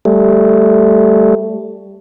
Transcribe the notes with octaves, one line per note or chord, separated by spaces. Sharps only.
G3 A3